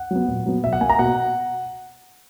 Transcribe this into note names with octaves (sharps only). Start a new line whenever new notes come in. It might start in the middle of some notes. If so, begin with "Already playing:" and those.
Already playing: F#5
F#3 B3
A#2
F#3 B3
B2 E5
F#5
A#3 G#5
A#5
B2 F#5